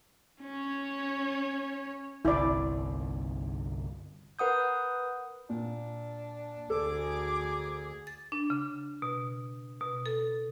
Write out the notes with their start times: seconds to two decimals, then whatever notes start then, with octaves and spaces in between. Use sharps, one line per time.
0.42 C#4 C#5
2.25 G1 C2 E4 D5
4.39 A#4 B4 F#5 D#6 G6
5.50 A#2 D4
6.70 D2 G#4 A4 D6
8.07 A6
8.32 D4
8.50 C#3
9.02 B2
9.81 B2
10.06 A4